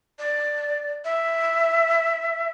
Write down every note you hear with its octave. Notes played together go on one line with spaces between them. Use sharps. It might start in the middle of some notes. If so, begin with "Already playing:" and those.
D5
E5